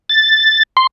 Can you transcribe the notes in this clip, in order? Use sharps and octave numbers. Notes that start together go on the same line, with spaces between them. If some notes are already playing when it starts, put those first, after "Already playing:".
A6
C6